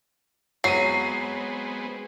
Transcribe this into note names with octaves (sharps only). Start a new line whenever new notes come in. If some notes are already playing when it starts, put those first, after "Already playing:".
F#3 G#3 B3 C4 C7 D#7